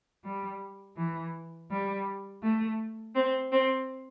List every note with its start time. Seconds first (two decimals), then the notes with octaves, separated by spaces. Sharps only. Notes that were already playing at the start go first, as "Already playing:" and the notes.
0.24 G3
0.96 E3
1.70 G3
2.42 A3
3.15 C4
3.52 C4